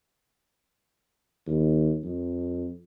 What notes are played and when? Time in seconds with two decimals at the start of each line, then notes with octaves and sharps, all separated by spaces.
1.47 D#2
2.03 F2